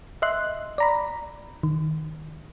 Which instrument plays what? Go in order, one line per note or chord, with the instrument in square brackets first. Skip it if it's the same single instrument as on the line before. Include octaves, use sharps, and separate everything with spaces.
[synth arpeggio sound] D#5 E5 C6 F#6
D5 A#5 B5
D#3